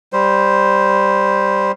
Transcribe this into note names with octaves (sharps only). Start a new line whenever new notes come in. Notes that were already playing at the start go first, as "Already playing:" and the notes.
G3 C5